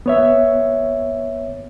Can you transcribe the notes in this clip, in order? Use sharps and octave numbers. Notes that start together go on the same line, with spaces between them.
B3 C#5 E5